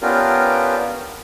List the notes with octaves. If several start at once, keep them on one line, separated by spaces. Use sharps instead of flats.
B3 C#4 D4 F4 G4 A#4